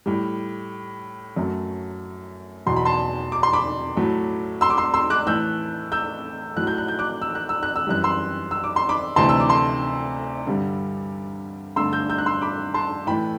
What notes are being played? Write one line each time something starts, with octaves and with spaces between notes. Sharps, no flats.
A2 G3
F#2 F#3 A3
E2 B2 F#3 C6
B5
A5 C6
D6
C6
B5 D6
A2 F#3 A3
C6 E6
D6
C6 E6
C6 E6
D6 F#6
A2 E3 A3 E6 G6
E6 G6
A2 F#3 A3 F#6
G6
F#6
G6
D6 F#6
E6
F#6
E6
F#6
E6
F#2 E3 G3 F#6
C6 E6
E6
D6
C6
B5 D6
D2 C3 E3 A3 A5 C6
E6
D6
A5 C6
G2 D3 G3
G2 D3 A3 C6 E6
E6 G6
E6 G6
F#6
C6 E6
B5 D6
A5 C6
A2 E3 A3 G5 B5